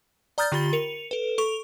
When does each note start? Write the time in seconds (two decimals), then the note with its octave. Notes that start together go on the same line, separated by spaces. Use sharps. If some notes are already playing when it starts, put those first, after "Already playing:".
0.38 D5 A#5 D#6 F6 G6 A6
0.52 D3 F4 G4 B5 A6 G7
0.73 A#4 C#7 F7
1.11 A4 B4
1.38 A4 C#6 F7